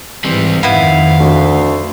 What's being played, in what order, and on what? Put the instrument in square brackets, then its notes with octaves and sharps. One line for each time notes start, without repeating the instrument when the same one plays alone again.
[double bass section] G#2 E3 [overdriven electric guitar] G3 C4
[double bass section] F2 D#3 [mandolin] B3 E4 [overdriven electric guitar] F5
[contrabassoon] D2